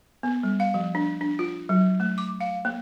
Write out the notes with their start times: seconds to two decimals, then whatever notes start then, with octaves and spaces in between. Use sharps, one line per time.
0.23 B3
0.43 G3
0.60 F5
0.74 F3
0.95 D4
1.21 D4
1.39 F4
1.69 F#3
2.00 A3
2.18 D6
2.40 F5
2.65 A#3